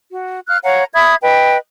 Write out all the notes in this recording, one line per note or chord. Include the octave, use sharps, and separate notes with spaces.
F#4
F5 F6 F#6
C#5 F5 F#5 A#5
E5 B5 D#6 G#6
B4 D#5 G5